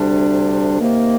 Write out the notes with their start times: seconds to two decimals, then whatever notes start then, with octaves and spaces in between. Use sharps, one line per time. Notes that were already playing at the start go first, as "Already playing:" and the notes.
Already playing: D2 C3 G3 D4
0.80 C3 D#3 A#3